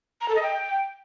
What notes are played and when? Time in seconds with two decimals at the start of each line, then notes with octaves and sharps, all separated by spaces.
0.21 A#5
0.28 A4
0.35 D#5
0.43 G5